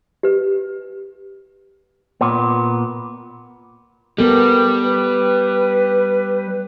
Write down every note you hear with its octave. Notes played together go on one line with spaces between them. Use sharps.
G4 B4
A#2 B3
G3 B3 A4 A#4
B4